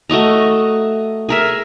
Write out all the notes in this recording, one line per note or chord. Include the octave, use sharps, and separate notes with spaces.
A3 F#4 D#5 A#5
G#4 A#4 E5